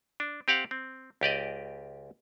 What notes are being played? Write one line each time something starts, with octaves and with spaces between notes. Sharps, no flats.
D4
C4 G4 F5 F#5
C4
C#2 G4 D5 D#5